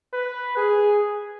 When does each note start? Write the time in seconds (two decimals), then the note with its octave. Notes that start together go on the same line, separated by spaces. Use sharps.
0.13 B4
0.57 G#4